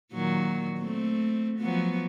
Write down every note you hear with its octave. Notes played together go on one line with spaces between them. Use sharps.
A#2 D#3 F#3
A3 C4
F3 F#3 B3